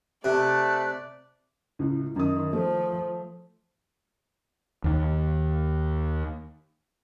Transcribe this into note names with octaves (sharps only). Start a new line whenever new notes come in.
C3 A3 D5 F#6
C#2 A2
F#2 D#3 D#6
F3 A3
D#2 D#3